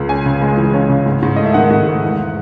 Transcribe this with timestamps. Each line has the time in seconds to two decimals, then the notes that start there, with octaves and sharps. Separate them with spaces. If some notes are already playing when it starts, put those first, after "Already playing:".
Already playing: C#2
0.09 C#4 G#5
0.26 C#3
0.42 G#3
0.58 E3
0.74 C#4
0.89 C#3
1.06 G#2
1.22 G#2
1.36 A3 D#5
1.46 E5
1.54 D#3 F#5
1.70 G#2
1.87 G#2
2.02 E2